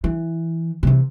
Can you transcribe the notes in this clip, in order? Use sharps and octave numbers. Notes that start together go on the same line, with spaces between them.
E3
C3 E3